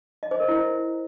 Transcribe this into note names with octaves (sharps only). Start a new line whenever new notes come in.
D#5
C5
A#4
E4